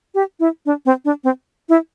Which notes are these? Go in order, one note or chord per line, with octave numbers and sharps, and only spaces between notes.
G4
E4
D4
C4
D4
C4
E4